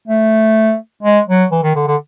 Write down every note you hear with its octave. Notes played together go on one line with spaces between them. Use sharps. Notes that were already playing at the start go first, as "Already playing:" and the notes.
A3
G#3
F#3
E3
D#3
D3
D3